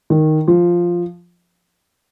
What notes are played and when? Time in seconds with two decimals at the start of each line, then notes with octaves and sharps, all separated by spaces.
0.10 D#3
0.48 F3